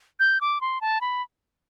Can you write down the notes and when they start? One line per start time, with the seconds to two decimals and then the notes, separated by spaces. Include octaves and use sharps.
0.20 G6
0.41 D6
0.61 C6
0.81 A5
1.01 B5